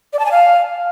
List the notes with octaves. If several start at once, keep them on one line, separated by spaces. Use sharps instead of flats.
D5
A5
G#5
F5